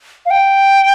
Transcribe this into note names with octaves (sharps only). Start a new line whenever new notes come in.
F5
G5